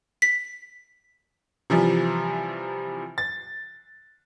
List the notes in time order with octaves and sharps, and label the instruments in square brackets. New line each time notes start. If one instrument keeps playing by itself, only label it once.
[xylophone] B6
[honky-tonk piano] C3 E3 F3 G3
A6